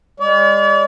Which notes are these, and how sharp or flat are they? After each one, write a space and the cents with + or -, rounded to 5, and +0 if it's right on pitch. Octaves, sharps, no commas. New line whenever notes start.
G#3 -40 D5 -45